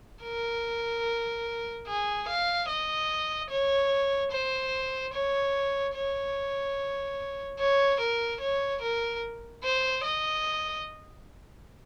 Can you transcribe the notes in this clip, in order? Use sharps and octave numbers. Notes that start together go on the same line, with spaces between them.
A#4
G#4
F5
D#5
C#5
C5
C#5
C#5
C#5
A#4
C#5
A#4
C5
D#5